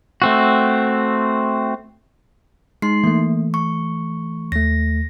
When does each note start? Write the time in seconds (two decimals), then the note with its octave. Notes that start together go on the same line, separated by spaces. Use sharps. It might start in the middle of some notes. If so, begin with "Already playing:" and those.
0.22 A3 C4 F#4
2.82 G#3 D#4 C6 C7
3.04 E3 A3 A#3
3.54 C#6
4.52 D#2 A3 A#6